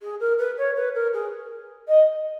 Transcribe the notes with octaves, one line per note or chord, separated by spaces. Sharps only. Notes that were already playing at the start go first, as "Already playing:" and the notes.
G#4
A#4
B4
C#5
B4
A#4
G#4
D#5